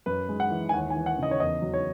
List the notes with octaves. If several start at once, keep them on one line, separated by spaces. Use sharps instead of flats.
F#2 B4
G#3
F#5
E3
G#5
D#2 F#5
E3 G#5
F#5
C#3 D#5
C#5
E2 D#5
F#3
C#5